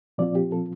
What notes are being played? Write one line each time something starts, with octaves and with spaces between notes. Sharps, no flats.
A#2 F3 C4 F4 D5
G4
A4